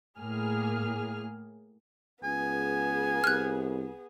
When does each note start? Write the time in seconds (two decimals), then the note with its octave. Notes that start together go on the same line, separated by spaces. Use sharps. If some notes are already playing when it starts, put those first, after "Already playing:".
0.18 A2 A#3 G#4 F6
2.24 C#2 B3 G#4 G#5
3.24 C2 F6 F#6